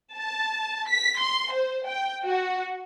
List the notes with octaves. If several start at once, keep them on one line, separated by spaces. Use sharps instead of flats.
A5
B6
C6
C5
G5
F#4